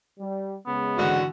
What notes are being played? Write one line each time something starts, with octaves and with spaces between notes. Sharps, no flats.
G3
C#3 G#3 B3
G#2 D3 E3 F#4 F#5